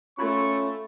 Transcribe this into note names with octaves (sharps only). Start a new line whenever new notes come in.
A3 C#4 F4 B5 C#6 G#6